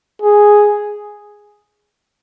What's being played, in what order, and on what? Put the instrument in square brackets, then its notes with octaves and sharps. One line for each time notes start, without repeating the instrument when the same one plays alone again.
[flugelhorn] G#4